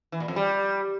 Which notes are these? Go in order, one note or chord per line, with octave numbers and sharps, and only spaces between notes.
E3
A#2
F2
G3